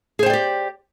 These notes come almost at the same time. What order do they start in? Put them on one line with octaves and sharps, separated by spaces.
G#4 C5 G5 D5 G4